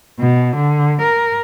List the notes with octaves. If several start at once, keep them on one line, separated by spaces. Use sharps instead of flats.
B2
D3
A#4